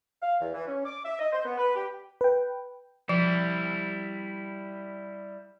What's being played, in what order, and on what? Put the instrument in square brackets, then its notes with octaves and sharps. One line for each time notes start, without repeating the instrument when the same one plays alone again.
[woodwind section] F5
E2
E3
C#4
D6
E5
D#5
C5
B3
B4
G4
[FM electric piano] B4 G5
[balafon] F3 [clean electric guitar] G3 E4